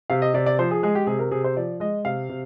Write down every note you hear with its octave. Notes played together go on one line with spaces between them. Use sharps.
C3 F5
D#5
C3 D5
D5
F3 C5
G#4
G#3 G#4
G4
C3 G#4
A#4
C3 G#4
C5
F3 D5
G#3 D#5
C3 F5
C3